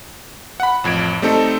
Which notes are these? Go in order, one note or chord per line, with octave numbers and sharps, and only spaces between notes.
F#5 B5
A1 F2 G#6 D7
G3 A3 C4 D#4 A4